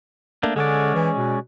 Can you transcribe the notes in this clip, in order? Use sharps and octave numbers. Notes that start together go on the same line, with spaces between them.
A3 A#3 D4
D3 G#3 C#4 D5
E3
B2